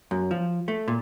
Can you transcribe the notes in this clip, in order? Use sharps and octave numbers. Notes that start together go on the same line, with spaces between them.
F#2
F3
A3
A#2